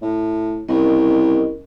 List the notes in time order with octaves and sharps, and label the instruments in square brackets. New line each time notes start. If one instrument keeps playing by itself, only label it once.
[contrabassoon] A2
[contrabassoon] C2 [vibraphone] C#4 A#4 D#5